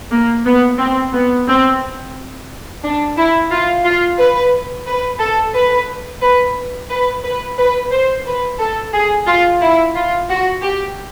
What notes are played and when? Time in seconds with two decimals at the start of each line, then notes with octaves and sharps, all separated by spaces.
0.11 A#3
0.45 B3
0.78 C4
1.12 B3
1.47 C4
2.83 D4
3.17 E4
3.50 F4
3.84 F4
4.19 B4
4.86 B4
5.20 A4
5.55 B4
6.21 B4
6.90 B4
7.24 B4
7.58 B4
7.91 C5
8.26 B4
8.59 A4
8.93 G#4
9.27 F4
9.62 E4
9.95 F4
10.29 F#4
10.62 G4